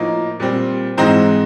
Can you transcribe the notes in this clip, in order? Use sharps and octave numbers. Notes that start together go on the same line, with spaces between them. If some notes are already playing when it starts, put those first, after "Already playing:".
Already playing: A2 F3 A#3 D#4
A#2 G3 C4
G#2 E3 G#3 C4 D#4 C5